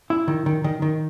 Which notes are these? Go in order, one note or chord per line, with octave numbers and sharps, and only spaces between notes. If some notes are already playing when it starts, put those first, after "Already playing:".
E4
D#3
D#3
D#3
D#3